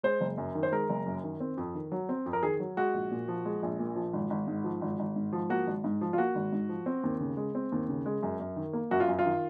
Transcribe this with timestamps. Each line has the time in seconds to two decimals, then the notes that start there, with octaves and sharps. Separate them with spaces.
0.03 G#3 C5
0.21 F#1
0.38 F#2
0.55 D#3
0.63 C5
0.72 G#3 A#4
0.90 F#1
1.06 F#2
1.24 D#3
1.40 C4
1.57 F2
1.75 D#3
1.92 F#3
2.09 C4
2.26 F2
2.33 A#4
2.43 D#3 G#4
2.60 F#3
2.77 G#3 F#4
2.94 A#1
3.11 A#2
3.28 F3
3.45 G#3
3.63 A#1
3.79 A#2
3.96 F3
4.13 G#1
4.30 G#1
4.47 G#2
4.64 F3
4.81 G#1
4.99 G#1
5.16 G#2
5.33 F3
5.50 A#3 F#4
5.67 G#1
5.84 G#2
6.01 F3
6.13 F4
6.18 A#3 F#4
6.35 G#1
6.52 G#2
6.69 F3
6.86 C4
7.03 D#2
7.20 C#3
7.37 G#3
7.55 C4
7.72 D#2
7.89 C#3
8.06 G#3
8.23 F#2
8.40 F#2
8.56 D#3
8.73 A#3
8.91 F#2 F#4
9.00 F4
9.08 F#2
9.19 F4
9.26 D#3